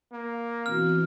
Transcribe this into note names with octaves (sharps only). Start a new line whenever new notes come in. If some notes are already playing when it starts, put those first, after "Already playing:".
A#3
B2 E3 C4 F#4 F6